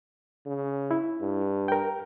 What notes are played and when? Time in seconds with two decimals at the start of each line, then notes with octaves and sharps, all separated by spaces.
0.46 C#3
0.91 E4
1.21 G2
1.68 A#4 G5